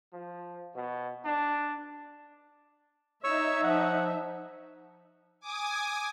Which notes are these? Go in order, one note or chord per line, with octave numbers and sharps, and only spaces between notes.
F3
B2
D4
D#4 C#5 E5 C#6 E6
F3 F#5
G#5 D6 D#6